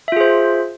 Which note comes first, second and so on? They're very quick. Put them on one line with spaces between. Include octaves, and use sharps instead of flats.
E5 F4 G#4 C5